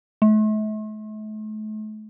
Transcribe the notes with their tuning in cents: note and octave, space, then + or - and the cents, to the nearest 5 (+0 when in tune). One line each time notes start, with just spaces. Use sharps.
A3 -40